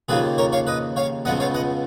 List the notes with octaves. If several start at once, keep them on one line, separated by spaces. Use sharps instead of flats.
D#2 C#3 F3 A#3 G#4 B4
A#4 C#5
C#5 F5
B4 D#5
C#5 F5
C#2 C#3 F3 B3 D#5 F#5
C#5 F5
D#5 F#5